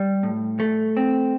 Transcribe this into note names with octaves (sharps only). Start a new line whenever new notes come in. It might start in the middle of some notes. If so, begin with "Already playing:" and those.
Already playing: G3
A2
A3
C4